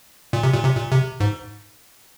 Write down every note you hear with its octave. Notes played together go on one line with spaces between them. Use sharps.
A#2
C3
A#2
C3
A#2
C3
G#2